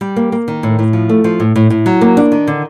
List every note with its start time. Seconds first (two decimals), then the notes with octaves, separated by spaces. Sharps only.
0.01 G3
0.16 A#3
0.32 A#3
0.48 D#3
0.63 A2
0.79 A2
0.93 F3
1.09 A3
1.24 F3
1.40 A2
1.55 A2
1.70 A2
1.86 F#3
2.01 A#3
2.17 D4
2.32 D#3
2.47 D3